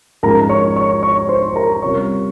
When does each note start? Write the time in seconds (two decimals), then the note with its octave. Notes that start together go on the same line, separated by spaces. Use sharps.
0.23 G#2 F3 G#3 C#4 A#4 A#5
0.49 C#5 C#6
0.76 C#5 C#6
1.02 C#5 C#6
1.29 C5 C6
1.55 A#4 A#5
1.82 C3 G3 C#4 F4 C#5 C#6